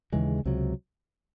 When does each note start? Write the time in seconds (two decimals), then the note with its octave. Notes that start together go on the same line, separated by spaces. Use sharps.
0.12 D#2 C#3 E3 G#3
0.45 C#2 C3 F#3